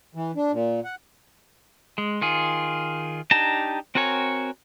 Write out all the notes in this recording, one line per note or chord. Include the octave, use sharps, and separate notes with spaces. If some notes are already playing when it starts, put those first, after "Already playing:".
E3
D4
A#2
F#5
G#3
D#3 F4 G#4
D4 D#4 G4 A5 A#5
C4 F#4 A#4 C#5 G#5